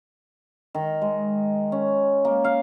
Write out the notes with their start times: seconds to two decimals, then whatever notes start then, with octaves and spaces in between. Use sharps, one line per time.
0.75 D#3
1.02 G#3
1.72 C#4
2.25 A#3
2.44 F5